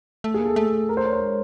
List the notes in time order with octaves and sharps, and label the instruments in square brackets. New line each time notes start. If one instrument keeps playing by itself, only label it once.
[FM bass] A3
[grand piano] G#4
[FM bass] A#3
[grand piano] A4
[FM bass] A3
[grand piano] A#4
C5
C#5
C5
[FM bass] G#3